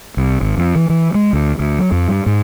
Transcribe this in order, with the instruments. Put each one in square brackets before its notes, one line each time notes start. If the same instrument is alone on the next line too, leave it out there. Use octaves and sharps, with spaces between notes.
[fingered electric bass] C2
G#1
F2
E3
E3
G#3
D2
D2
F#3
F2
G2
G#2